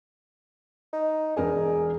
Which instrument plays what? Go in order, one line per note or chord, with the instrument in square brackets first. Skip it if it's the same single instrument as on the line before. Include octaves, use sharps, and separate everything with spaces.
[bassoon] D#4
[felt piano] E1 A#4 D5 [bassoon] G#4